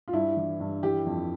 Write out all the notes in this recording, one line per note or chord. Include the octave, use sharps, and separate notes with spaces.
F4
G2 E4
E3
G2
E3 G4
F2